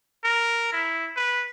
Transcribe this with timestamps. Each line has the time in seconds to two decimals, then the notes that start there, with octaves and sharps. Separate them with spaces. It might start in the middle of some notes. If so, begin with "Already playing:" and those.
0.24 A#4
0.73 E4
1.16 B4